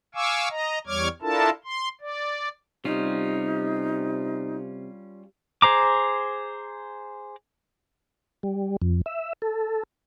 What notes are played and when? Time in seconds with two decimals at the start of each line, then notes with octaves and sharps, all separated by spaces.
0.15 F5 G#5 C#6 D6 E6
0.50 D#5 A#5
0.87 E2 G3 C#5 D6 F6 G#6
1.22 D4 E4 F4 A4 A#4 A5
1.64 C6
2.01 D5
2.85 C3 G3 C#4 D#4 F4
5.62 G#4 C5 A#5 D6
8.43 G3
8.82 F2
9.06 E5
9.42 A4